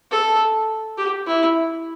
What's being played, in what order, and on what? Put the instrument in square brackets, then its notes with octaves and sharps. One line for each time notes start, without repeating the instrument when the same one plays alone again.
[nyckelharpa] A4
G4
E4